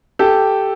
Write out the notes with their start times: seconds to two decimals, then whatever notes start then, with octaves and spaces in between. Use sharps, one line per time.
0.19 G4 A4